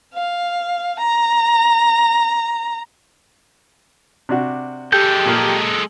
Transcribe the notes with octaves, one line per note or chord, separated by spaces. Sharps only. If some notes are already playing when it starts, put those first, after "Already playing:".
F5
A#5
C3 D4 F#4
G#3 G4 A4 G6
A#2 A#3 F6